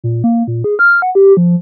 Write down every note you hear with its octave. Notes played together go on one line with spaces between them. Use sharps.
A#2
A#3
A#2
G#4
F6
F#5
G4
F3